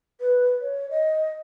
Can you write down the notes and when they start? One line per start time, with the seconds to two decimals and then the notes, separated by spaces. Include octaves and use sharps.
0.21 B4
0.61 C#5
0.91 D#5